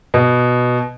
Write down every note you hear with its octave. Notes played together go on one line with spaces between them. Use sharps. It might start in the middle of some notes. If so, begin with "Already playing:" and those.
B2